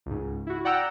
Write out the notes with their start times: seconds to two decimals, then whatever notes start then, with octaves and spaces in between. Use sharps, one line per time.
0.06 C#2 G#2
0.47 E4 F#4
0.65 D5 F#5 G5 A#5 E6